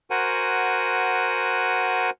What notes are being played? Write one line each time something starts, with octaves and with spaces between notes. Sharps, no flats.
F#4 A#4 C5 F#5 G#5